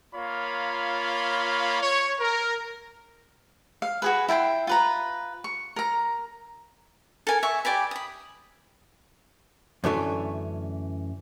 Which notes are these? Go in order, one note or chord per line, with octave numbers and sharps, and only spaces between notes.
A#3 F4 C#5 B5
C#5
A#4
F5
F#4 G#4 B4
E4 G5 G#5 C6
F4 B4 A#5
C#6
A#4 A#5
A4 A#4 G#5
E5 G#5 C#6
G4 D5 G#5 B5
B5 D#6
F#2 D3 E3 A3 C#4